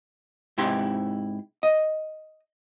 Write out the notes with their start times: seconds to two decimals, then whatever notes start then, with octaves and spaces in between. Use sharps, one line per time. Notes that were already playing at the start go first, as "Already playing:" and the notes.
0.58 G#2 C3 E4 G4 C6
1.63 D#5